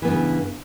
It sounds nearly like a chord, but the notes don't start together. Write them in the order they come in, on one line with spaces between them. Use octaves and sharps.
E3 B3 G2 C#3